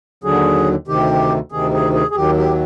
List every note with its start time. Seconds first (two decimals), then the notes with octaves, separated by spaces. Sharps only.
0.24 D#2 D3 F#3 G#4
0.88 D2 C3 D#3 G4
1.52 D2 C3 D#3 G#4
1.74 G#4
1.94 G#4
2.11 G#4
2.15 D#2 D#3 F#3 G4
2.38 G4